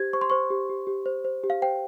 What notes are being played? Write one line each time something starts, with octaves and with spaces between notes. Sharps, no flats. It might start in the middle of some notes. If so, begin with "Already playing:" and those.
Already playing: G4 C5 G#6
C5 C#6
C6
C5 C#6
G4
G4
G4
C5
C5
G4
F5
C5 G5